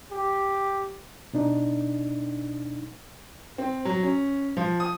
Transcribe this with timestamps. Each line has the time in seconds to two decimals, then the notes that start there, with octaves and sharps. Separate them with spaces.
0.11 G4
1.33 B2 D4 D#4
3.58 C4
3.85 F#3
4.03 C#4
4.57 F3
4.80 D#6